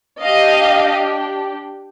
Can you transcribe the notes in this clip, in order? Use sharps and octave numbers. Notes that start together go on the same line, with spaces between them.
D4 G4 D#5 F5